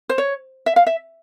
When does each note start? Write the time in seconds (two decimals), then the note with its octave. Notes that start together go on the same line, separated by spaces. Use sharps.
0.09 C5
0.18 C#5
0.66 E5
0.76 F5
0.87 E5